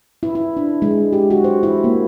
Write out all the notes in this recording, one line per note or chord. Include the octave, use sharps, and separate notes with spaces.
E4
E4
D4
G#3
G4
F#4
C5
E4
A#3